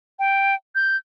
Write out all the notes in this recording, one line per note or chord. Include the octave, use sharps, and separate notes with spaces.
G5
G6